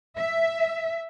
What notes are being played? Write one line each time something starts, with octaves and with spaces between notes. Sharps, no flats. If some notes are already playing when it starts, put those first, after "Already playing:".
E5